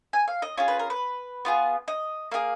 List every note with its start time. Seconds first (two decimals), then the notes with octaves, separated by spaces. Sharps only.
0.13 G#5
0.28 F5
0.42 D#5
0.57 C#4 F4 G#4 C#5
0.68 B4
0.79 A#4
0.90 B4
1.45 B3 F4 G#4
1.88 D#5
2.31 A#3 F4 G#4 F5